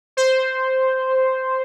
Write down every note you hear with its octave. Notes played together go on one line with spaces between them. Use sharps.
C5